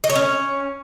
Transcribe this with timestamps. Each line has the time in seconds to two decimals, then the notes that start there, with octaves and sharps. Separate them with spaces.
0.04 D#5
0.10 C#5
0.15 C#4